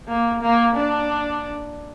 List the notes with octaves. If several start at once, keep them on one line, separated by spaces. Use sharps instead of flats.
A#3
A#3
D4